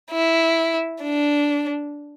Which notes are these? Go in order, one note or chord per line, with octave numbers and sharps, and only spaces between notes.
E4
D4